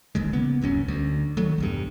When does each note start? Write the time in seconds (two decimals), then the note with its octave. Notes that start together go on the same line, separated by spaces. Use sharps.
0.15 D1 A1 D#2 G#3
0.33 C#3 A#3 B3
0.61 D1 C2 F#2 C#4
0.88 D2
1.37 D#3 F#3 A3
1.58 B1 E2 G2